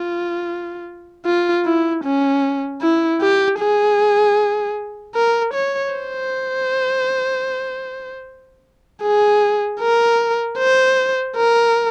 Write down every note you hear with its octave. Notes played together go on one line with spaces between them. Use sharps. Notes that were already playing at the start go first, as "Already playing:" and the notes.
Already playing: F4
F4
E4
C#4
E4
G4
G#4
A#4
C#5
C5
G#4
A#4
C5
A#4